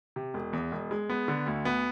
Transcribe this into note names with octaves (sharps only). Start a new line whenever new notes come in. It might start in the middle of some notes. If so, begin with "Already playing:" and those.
C3
E1
E2
E1
G#3
B3
D3
D2
B3